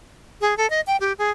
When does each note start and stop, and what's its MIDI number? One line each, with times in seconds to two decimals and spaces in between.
0.41 0.57 68
0.57 0.69 69
0.70 0.81 75
0.87 0.97 79
1.00 1.13 67
1.19 1.31 68